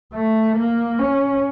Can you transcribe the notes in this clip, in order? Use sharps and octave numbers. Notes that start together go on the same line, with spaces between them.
A3
A#3
C#4